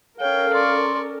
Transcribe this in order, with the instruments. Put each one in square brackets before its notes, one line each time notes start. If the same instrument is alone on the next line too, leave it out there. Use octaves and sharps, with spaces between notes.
[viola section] C#4 A4 A#4 [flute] C#5 [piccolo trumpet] F5 [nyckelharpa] G5
[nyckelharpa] D5 C#6 [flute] C6